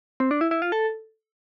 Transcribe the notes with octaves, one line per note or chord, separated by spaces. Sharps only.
C4
D4
E4
E4
F4
A4